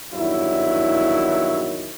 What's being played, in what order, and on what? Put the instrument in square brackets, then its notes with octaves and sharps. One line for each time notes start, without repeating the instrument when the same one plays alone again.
[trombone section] E2 G2 D#3 F#3 E4